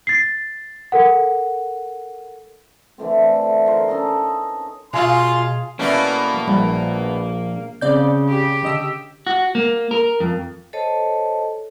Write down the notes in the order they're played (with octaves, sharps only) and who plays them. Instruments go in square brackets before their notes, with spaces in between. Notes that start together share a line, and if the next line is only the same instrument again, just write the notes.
[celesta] A6 C7
A4 A#4 F#5
[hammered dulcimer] D3 E3 A3 C4
A#4 C5
C#4 D#4 A4 D#5
[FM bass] B2 [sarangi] F4 [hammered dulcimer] G#4 [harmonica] C6
[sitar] B2 A3 E4 [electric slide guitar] A#3 [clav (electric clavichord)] C#4 D5 F5
[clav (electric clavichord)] A#1 [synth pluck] G3
[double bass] C#3 [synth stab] C4 D5 G6
[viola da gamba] G4
[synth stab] D3 D#5 E6
[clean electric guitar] F#4
A#3
A#4
F2
[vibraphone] A4 C5 C#5 D#5 A5